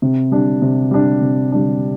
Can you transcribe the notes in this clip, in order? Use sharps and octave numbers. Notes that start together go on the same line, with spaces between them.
C3
G3 D4
C3
G3 D4
C3
G3 D4